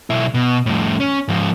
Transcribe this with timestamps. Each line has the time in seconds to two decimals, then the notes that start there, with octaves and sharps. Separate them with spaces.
0.10 B1 E4
0.34 B2
0.66 F2 A2
1.00 C#4
1.28 G#2 F3